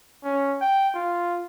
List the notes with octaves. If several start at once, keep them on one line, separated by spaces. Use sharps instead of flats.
C#4
G5
F4